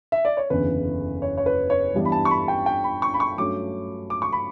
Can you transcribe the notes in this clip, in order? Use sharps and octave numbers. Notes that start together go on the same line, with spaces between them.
E5
D5
C#5
F#1 E2 D3 B4
C#5
C#5
B4
C#5
G2 E3 G3 B3 D4
B5
A5
C#6
B5
G5
G5
B5
C#6
B5
C#6
G2 F#3 A3 C#4 D6
D6
C#6
B5